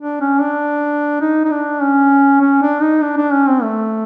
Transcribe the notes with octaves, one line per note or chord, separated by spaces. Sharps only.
D4
C#4
D4
D#4
D#4
D4
C#4
C#4
D4
D#4
D4
D4
C#4
C4
A3